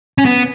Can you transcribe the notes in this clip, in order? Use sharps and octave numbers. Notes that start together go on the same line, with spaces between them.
C#4
B3